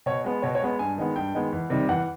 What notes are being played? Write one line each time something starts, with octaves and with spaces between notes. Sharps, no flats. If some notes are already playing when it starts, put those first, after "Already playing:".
B2 C#5
G#3 B3
B2 C#5
C#5
G#3 B3
G2 G#5
D#3 G#3 B3
G2 G5
D#3 G#3 B3
E2
C3 D#3 G3
E2 F#5